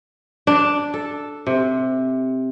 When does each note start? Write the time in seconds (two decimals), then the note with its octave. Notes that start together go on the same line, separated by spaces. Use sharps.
0.47 D4
0.94 A4
1.47 C3